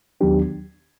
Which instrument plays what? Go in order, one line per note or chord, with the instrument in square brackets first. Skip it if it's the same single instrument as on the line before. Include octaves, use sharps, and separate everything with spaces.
[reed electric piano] D#2 D#3 F#3 B3 D4 G4